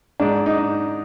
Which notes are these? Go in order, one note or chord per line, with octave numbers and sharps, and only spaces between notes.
G#2 D4
D#4